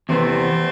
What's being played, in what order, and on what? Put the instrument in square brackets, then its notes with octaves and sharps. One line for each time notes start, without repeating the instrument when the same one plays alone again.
[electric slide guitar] E2 C3 E3 B3 [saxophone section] A3 C4